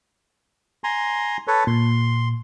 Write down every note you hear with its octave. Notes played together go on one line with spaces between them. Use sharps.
G#5 A#5 C6
A4 B4 C#5
A#2 C6